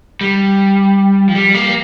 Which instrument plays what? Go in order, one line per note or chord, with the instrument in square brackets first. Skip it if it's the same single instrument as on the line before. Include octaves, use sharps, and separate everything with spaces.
[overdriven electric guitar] G3
F3
G3
A#3